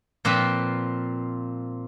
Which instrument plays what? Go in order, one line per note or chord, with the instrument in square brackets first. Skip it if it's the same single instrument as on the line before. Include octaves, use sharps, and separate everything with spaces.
[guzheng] A#2 F3 C4 B4 B5